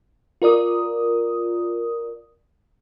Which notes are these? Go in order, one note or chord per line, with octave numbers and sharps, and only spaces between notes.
F4 A#4 D5 D#6